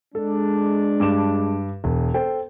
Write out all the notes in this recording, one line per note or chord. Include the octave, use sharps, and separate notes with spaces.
G#3 D4 A4
G2 D6 E7
E1
A4 C5 G5